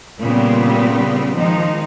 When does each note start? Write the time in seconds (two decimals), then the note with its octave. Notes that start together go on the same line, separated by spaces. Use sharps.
0.20 A#2 C#3 G3 B3 C4
1.35 D#3 F3 G#3 D#4